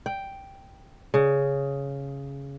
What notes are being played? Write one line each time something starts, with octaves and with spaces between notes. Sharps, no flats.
G5
C#3